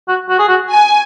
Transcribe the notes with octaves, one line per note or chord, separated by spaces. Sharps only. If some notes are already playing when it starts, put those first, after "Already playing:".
F#4
F#4
G#4
F#4
G#5